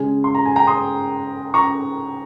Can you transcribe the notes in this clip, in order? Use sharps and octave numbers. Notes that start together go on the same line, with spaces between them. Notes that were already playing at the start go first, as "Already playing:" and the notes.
Already playing: C#3 G#3 C#4 G#5
C6
A#5
G#5
G5 A#5
C6 D#6
A#5 C#6